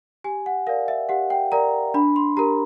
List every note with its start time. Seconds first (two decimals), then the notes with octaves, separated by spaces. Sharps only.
0.24 G4 G#5
0.46 F#5
0.67 A#4 D5 F5
0.88 E5
1.09 G4 F#5
1.30 G5
1.52 A#4 D5 A#5
1.94 D4 B5
2.16 C6
2.37 G4 A#4 A#5